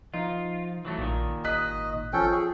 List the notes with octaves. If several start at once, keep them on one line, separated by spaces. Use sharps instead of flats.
F3 D#4 F4
E3 F#3 A3
A#1 A#2 D#3
G#1 D#5 D#6 F#6 B6
F3 C#4 A4 G5
G#4